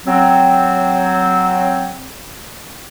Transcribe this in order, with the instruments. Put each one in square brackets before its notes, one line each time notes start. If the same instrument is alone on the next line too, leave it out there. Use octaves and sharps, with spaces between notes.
[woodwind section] F#3 C4